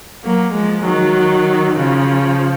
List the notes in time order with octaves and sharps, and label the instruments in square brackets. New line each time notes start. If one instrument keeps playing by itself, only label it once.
[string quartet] F#3 A#3
F3 G#3
D#3 F#3
C#3 F3